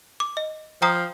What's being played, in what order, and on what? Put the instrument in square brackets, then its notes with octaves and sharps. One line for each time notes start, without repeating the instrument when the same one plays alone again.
[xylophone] D6
D#5
[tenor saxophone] F3 [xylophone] G5 A#5 D#6